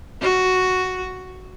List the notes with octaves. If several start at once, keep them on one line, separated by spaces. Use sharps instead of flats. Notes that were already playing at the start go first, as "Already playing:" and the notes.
F#4